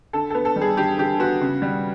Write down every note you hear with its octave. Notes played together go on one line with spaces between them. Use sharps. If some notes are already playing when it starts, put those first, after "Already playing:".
D3 A4
B3 A4
A4
G3
G#4
D3 G4
D3 G4
B3 F#4
C#3
G3